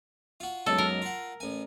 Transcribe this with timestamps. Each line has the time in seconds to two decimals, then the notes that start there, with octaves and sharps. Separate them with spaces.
0.40 F4 F#4
0.66 B1 F#2 G#3 A4
0.78 A#4
1.02 F4 F#5
1.40 A1 G#5